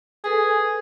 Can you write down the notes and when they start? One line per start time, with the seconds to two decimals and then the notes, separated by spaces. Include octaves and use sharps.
0.24 G#4 A4 B4 G#5